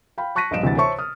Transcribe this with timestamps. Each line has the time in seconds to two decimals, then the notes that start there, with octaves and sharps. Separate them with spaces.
0.18 F5 G5 B5
0.35 A5 C#6 F#6 A#6 B6 D#7
0.51 A#1 G2 D#5 F5 D7 E7
0.63 D2 C3 E3 F#5 A6
0.77 C5 C#5 E5 A5 C#6
0.99 D#6 F6